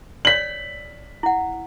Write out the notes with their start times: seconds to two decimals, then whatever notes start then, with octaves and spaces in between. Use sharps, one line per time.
0.25 C#5 D5 B6 F#7
1.23 E4 F#5